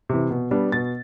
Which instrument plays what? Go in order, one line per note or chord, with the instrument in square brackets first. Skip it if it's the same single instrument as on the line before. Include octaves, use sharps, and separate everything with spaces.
[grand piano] C3 E3
B2
G3 B3 D4
B2 A6